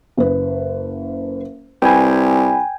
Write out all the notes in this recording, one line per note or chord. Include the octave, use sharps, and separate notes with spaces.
F#1 B4
C2 B4 G5 G#5 B5